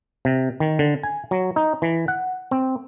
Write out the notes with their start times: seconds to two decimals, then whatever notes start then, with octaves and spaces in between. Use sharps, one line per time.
0.25 C3
0.60 D#3
0.79 D3
1.03 G#5
1.31 F#3
1.56 D#4
1.82 E3
2.08 F#5
2.51 C4